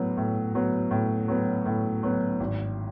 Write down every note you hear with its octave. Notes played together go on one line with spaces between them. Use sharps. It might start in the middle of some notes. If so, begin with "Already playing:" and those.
Already playing: A2 F#3 B3
A2
F#3 B3
A2
F#3 B3
A2
F#3 B3
G#1